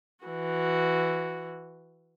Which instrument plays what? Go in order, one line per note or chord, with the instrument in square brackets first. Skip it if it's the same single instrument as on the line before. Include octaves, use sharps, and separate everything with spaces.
[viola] E3 F#4